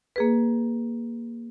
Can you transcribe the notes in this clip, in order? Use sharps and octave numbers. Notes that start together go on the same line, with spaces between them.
A#3 G#4 B4